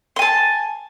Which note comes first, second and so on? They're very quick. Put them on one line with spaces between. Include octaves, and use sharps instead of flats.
C6 G#5 A5